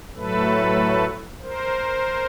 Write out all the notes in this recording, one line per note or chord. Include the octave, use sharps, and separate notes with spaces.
A2 F#3 A3 A4 B4
A#4 C5